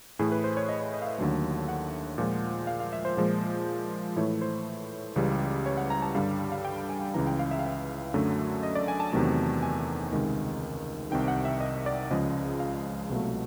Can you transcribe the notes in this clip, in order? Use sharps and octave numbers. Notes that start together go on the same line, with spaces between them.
A2 E3 A3 G#4
B4
C5
C#5
D#5
C#5
D#5
F5
E5
D#2 D3 F#3 A3
F#5
A#2 F3 G#3
F5
F5
E5
C5
A#2 F3 G#3
A2 E3 A3 C#5
C5
C#2 C#3 E3 G3
C#5
F#5
A#5
A5
G2 D3 G3 F5
F5
G5
G#5
C#2 C#3 E3 A#5
G5
F5
E5
F5
E5
F#2 D3 F#3 A3
D#5
D5
G#5
A5
E2 C3 D#3 F#3 A3 A5
G#5
C#2 C3 D#3 G#3
C2 C3 D#3 G5
F#5
E5
D#5
D5
C#2 C#3 F3 G#3 D#5
F5
C2 B2 F#3 A3